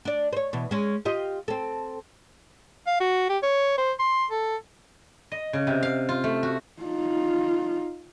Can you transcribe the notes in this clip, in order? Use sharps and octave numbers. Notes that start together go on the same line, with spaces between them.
D4 D5
C5 C#5
B2 E3
G#3 C#4
F4 G4 D#5
C4 A4
F5
F#4
G4
C#5
C5
C6
A4
D#5
C#3
C3
F5
F4
A3
F#4
D#4 F4